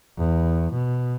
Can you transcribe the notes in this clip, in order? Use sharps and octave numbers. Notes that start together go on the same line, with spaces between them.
E2
B2